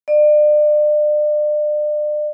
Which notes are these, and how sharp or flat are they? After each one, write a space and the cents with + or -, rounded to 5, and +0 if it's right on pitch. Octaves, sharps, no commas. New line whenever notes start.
D5 +35